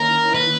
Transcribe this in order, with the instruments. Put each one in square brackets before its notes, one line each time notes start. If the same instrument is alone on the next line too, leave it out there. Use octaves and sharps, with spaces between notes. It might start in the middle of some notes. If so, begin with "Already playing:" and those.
Already playing: [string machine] D#3 A#3 C#4 E4 [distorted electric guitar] A#4
[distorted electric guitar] B4